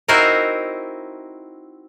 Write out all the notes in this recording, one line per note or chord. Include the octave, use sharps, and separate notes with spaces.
C4 D#4 E4 F#4 A#4 C5